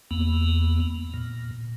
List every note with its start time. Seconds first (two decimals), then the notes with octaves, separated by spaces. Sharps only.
0.11 E2 A#3 B3
1.14 A#2